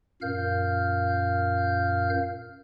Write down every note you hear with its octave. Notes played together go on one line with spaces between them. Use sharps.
F#2 A#2 A#4 F5 F6 G6